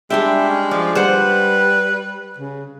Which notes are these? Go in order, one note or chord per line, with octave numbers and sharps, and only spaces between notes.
G3 G#3 D4 E5 G5
C#4
F3 D5
G3 B4 C5 F#5
C#3